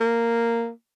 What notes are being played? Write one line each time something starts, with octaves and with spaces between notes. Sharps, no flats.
A#3